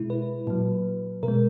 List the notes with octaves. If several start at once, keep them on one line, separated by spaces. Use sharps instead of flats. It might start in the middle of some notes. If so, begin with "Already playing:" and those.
Already playing: B2 G#3 E4
B4
A#2 F#3
B2 A#4
G#3